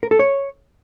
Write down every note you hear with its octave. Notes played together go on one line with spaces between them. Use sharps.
A#4
A4
C#5